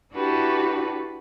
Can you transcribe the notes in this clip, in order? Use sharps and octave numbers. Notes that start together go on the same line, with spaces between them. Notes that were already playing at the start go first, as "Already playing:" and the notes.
D4 E4 F#4 G4 A4 B4